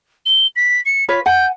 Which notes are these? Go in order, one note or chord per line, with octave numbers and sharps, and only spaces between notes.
G7
B6
C#7
F4 B4 C#5 B6
F#5 G#5 G6